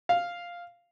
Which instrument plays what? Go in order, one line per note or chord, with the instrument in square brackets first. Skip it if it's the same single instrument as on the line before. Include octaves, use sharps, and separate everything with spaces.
[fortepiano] F5